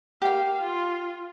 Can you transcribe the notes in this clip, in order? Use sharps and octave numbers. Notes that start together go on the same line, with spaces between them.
A#3 G4 F5 G5
F4